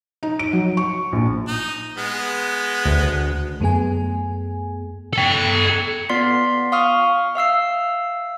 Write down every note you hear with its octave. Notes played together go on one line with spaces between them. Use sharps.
D#4
D7
F#3
C#6
A#1
D#4
G#3 B3
D2
F#2 A3 B3 G#4 G#5
A4 G5
B3 F4 D5 C6 B6 C7
F5 C#6 D#6 F6
E5 F5 E6 C7